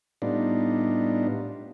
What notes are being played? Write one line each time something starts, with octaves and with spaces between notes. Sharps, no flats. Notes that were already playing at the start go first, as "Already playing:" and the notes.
A2 G3 B3 D4 D#4 F4